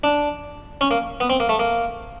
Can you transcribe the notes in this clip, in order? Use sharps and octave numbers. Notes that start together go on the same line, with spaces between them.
D4
C#4
A#3
B3
C4
A#3
A3
A#3